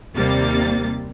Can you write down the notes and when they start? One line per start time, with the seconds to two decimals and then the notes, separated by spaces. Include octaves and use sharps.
0.15 D#2 C3 G3 A#3 A6